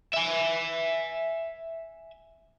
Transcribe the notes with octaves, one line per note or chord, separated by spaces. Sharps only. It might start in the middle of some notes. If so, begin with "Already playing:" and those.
E5 G#5